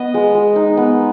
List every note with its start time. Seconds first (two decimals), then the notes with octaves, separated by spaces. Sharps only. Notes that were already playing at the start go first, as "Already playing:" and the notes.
Already playing: B3 D#5
0.14 G#3
0.34 G#3
0.56 D#4
0.77 B3